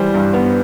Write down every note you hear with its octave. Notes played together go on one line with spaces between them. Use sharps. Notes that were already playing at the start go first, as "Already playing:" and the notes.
Already playing: E3 G3 C5
G2
B3